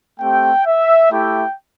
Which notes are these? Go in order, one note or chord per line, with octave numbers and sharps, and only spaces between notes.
A3 C4 G4 G5
E5
A3 E4 G4 G5